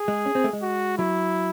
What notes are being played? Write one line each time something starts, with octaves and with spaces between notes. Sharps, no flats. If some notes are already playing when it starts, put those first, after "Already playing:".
Already playing: G#4
G#3
C#4
C4
A3
G#3
F#4
F#3 E4